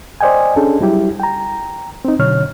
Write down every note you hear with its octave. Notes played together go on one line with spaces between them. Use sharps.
C5 D5 D#5 G5 G#5
C#4 D4 G#4 A4
F#3 G3 E4 G4
G5 A#5
C4 D#4
B2 D3 F#3 C#5 F6